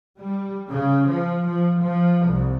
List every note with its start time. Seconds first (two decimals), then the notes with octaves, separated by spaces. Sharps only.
0.19 G3
0.69 C#3
1.08 F3
1.46 F3
1.80 F3
2.24 C2